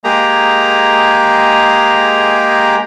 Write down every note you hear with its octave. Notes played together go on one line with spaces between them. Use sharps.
G#3 A#3 G4 G#4 A#5